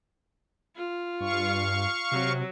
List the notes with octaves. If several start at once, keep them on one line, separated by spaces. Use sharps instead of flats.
F4
G2 F5 C#6
C3 F#3